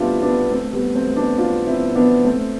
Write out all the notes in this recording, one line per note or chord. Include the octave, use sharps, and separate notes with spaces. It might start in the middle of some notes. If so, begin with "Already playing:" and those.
Already playing: G3 A3 B3 C4 D4 E4 F4 G4
B3 D4
A3 C4
G3 B3
A3 C4
B3 D4
D4 F4
C4 E4
B3 D4
A3 C4